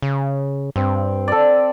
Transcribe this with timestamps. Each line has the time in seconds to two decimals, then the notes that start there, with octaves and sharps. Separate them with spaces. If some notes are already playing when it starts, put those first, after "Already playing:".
0.02 C#3
0.76 G2 C4
1.28 A4 D5